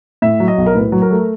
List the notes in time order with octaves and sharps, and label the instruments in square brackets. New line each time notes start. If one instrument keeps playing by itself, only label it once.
[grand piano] A2 E5
F#3
D#5
B1
A#4
A2 B4
F#3
A#4
A3